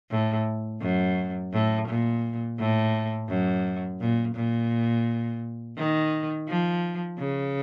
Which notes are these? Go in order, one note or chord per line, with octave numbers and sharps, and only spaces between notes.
A2
F#2
A2
A#2
A2
F#2
A#2
A#2
D#3
F3
C#3